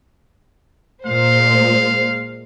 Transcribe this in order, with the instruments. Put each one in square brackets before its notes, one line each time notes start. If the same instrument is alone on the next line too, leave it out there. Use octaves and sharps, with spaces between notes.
[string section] A#2 G#3 C5 [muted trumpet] F5